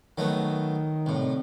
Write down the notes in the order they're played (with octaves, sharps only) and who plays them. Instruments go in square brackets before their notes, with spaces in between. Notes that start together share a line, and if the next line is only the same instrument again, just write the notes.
[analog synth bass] D#3 [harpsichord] F#3 A3 B3
[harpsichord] C2 A2